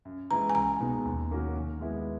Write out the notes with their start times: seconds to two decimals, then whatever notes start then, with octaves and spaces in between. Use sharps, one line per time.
0.05 F#2
0.31 E3 G#3 A#5
0.50 G#5
0.55 C#2 A#5
0.80 B2 G#3 B3 D#4
1.05 D#2
1.31 D#3 A#3 C#4 F#4
1.56 D#3
1.81 G#3 B3 E4